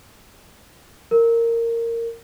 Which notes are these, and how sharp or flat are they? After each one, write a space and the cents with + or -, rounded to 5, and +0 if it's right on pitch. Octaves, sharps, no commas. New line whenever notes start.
A#4 -15